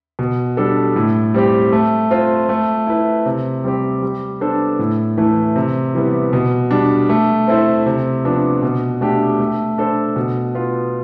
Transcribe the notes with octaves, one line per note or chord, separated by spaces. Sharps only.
B2
G3 D4 A4
A2
G3 C4 G4
A3
C4 F4 C5
A3
E4 B4
C3
G3 C4 G4
G3
B3 D4 A4 C5
A2
E3 A3 E4
C3
E3 G3 B3
B2
G3 D4
A3
C4 E4 A4 C5
C3
F3 B3 D4
B2
A3 D4 G4
A3
D4 A4 C5
B2
B3 F4